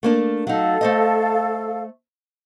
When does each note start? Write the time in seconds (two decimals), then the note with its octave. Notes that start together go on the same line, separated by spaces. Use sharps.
0.03 A3 A#3 D4
0.47 F#3 D#4 A4 F5
0.81 A3 C5 D#5